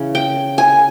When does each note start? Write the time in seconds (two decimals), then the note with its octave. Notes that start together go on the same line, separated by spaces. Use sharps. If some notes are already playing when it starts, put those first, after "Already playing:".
Already playing: C#3 E3
0.15 G5
0.58 G#5